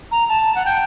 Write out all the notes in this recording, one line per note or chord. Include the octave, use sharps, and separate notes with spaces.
A#5
A5
F#5
G5